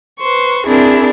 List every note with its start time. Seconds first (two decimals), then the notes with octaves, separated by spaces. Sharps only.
0.20 B4 C5 C#6
0.66 C4 D4 E4 G#4 A#4